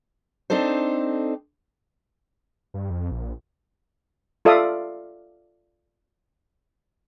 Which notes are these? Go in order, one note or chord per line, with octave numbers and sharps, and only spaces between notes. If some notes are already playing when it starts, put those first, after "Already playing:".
C4 D4 D#4 A4 C5
G2
F2
A#1
F4 A4 D5 E5 F5 D#6